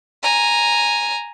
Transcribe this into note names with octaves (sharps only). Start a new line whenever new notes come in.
G#5 A#5